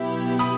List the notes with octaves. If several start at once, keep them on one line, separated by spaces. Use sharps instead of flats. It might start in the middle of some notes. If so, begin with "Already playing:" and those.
Already playing: B2 F#3 B3 E4 G4 B5
B5 D#6